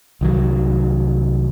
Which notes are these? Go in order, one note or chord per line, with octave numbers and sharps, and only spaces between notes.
C2 D#3 F#3